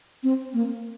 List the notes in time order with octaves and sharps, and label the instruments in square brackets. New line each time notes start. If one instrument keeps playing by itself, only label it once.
[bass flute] C4
A#3